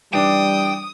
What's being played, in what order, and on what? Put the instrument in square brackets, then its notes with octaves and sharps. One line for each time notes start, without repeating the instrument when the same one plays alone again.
[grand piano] E3 D4 [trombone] G3 [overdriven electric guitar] G5 [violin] D#6